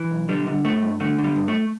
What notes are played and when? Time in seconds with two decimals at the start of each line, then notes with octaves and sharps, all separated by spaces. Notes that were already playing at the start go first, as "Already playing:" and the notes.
Already playing: E3
0.11 B1
0.29 D3 G3
0.47 D3
0.64 G2 A3
0.82 G2
1.00 D3 A3
1.18 D3
1.24 G3
1.36 G2
1.48 A3